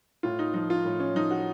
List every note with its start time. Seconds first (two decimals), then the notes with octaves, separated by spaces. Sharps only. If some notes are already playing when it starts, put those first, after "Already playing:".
0.23 A2 F4
0.39 D#4
0.54 F3 D#4
0.70 F4
0.85 A2
1.00 C#4
1.15 F3 D#4
1.31 F#4